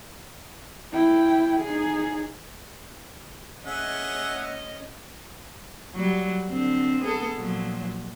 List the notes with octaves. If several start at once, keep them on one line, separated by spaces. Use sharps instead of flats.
E4 G5
D#4 G#4
C#4 G#4 D#5 E5 F#5
F#3 G3
D3 C4
B3 G#4 A4
A#2 F3 F#3